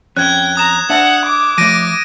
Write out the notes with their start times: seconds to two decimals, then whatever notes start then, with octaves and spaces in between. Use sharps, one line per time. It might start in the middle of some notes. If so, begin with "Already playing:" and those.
0.17 F2 C#4 G5 F#6 G#6
0.57 A#5 D#6 E7
0.90 D4 E5 F#5 A5
1.25 D6
1.58 F3 A3 A#6 D7 D#7